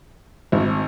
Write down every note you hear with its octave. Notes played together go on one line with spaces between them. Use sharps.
G#1